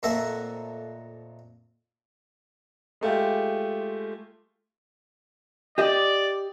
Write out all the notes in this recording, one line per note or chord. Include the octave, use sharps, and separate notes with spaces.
F2 A#2 A3 A#3 E5 F#5
G#3 A3 F4 G4
G4 D5 D#5